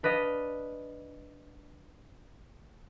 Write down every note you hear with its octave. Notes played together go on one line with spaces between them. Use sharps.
D4 B4 D5 D#5 F5